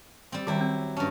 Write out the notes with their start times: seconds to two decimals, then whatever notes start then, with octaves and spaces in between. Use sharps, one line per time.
0.32 G3 C4
0.47 D#3 F#3 G3 E4 G4
0.61 C4
0.97 G2 C#4 A5